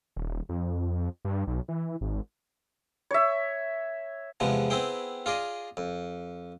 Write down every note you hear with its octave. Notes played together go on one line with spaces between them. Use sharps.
D#1
F2
G2
B1
E3
G#1
C#5 E5
E2 C3 F3 G#3 B3
B3 C4 E4 G#4 G5
F4 G#4 D5 D#5
F2